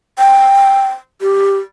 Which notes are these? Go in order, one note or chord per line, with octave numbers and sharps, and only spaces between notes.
G5
G4